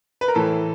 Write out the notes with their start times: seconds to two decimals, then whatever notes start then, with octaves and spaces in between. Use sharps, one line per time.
0.21 B4
0.28 A#4
0.35 A2 E3 A4